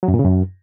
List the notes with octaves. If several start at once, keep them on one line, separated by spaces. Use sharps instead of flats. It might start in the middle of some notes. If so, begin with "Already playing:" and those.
F#3
F#2
A#2
C#3
F#2